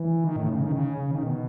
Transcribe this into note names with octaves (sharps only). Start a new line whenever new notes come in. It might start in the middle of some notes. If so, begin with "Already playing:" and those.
Already playing: E3
D#3
A2
C#3
D#3
C#3
C#3
D#3
B2